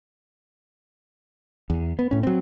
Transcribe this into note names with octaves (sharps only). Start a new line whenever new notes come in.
E2
B3
A2 C#4
F#3 C4